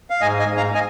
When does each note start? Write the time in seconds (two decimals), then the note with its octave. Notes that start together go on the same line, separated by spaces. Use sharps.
0.10 F5
0.21 G#2 D#5 G#5
0.39 D#5 G#5
0.48 G#2
0.57 F5 A#5
0.75 D#5 G#5